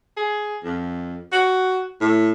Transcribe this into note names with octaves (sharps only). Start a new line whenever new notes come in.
G#4
F2
F#4
A2